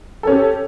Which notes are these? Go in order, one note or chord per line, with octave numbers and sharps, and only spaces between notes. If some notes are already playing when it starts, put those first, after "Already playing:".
C#4 G4 A4